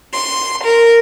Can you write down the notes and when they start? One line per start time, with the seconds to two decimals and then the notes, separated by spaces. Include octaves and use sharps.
0.13 C6
0.64 A#4